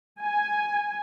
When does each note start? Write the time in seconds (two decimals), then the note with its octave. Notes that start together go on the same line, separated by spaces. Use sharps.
0.20 G#5